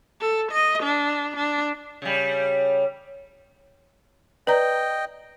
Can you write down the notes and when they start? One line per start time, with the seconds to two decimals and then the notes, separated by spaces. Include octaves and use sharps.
0.21 A4
0.51 D#5
0.83 D4
1.36 D4
2.02 C#3 G3
4.47 B4 D5 D#5 G5 A#5